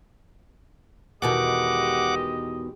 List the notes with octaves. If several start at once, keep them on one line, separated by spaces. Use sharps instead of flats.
E2 B2 D#3 G#3 G4 D#5 F#5 D6